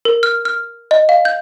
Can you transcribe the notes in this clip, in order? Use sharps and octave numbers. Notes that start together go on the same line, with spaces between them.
A#4
F6
F6
D#5
F5
G6